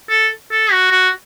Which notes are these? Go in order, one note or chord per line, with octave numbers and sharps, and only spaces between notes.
A4
A4
F#4
F#4